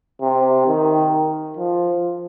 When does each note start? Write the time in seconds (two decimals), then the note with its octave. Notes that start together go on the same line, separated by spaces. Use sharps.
0.22 C3
0.67 D#3
1.57 F3